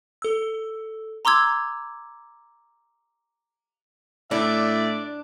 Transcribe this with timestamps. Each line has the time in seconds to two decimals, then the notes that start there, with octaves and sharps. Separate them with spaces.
0.22 A4 E6
1.25 A#5 C6 D6 E6 G#6
4.31 A2 D4 D5 E5